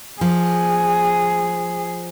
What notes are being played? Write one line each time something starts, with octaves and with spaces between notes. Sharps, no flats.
F3 G#4